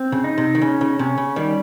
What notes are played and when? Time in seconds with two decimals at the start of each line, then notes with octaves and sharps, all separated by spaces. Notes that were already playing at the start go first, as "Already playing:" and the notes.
Already playing: C4
0.12 C#3
0.24 D#4
0.38 C3
0.55 D#3
0.62 C#3 C#4
0.81 C#3
0.99 C3 C#4
1.18 C#3
1.36 D#3 G3